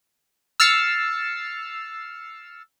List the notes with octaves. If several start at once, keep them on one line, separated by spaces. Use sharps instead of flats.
E6 F6 A6 C7 C#7